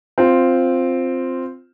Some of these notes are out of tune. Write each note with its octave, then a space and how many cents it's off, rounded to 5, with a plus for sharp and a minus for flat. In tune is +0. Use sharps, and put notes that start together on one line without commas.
C4 +0 F4 +0